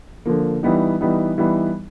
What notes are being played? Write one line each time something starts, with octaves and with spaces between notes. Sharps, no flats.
D3 F3 A#3
E3 G3 B3 D#4
E3 G3 B3 D#4
E3 G3 B3 D#4